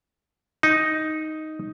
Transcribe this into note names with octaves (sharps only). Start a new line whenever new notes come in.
D#4